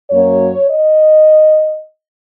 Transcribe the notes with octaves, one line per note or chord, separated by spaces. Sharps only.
F#2 F#3 A#3 C#5
D#5